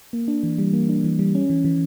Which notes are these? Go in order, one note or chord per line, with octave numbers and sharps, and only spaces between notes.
A#3
D4
E3
G3
A#3
D4
E3
G3
C#4
E3
E3